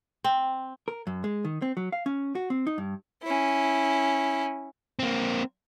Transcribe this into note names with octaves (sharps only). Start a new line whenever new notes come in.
C4
A#4
F#2
G#3
D#3
C4
F#3
F5
C#4
F#4
C4
D#4
G2
C#4 E4
A#3 C4